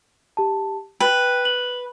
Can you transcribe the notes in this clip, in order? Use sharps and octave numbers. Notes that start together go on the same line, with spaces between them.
G4 A5
B4 G5
F#7